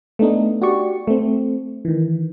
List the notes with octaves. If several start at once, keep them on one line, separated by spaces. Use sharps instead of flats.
A3 B3 D4 D#4
F#4 G4 D5 C#6
A3 C4
D#3 E3